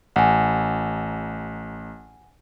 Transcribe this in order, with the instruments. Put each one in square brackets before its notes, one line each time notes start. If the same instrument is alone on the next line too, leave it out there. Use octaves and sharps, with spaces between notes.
[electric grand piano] A1 [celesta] F#5 G#5